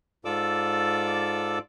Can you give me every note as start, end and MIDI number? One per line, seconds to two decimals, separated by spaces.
0.25 1.59 44
0.25 1.59 65
0.25 1.59 69
0.25 1.59 74
0.25 1.59 86
0.25 1.59 88